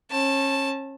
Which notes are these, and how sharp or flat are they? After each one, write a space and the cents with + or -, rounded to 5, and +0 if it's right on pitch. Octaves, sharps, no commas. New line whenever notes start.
C#4 -30 A5 +0